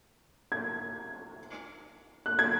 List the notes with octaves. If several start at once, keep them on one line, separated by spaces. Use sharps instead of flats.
G#6
F#6
G#6